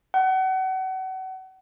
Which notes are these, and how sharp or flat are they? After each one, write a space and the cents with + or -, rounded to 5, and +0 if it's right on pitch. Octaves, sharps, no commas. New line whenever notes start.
F#5 +35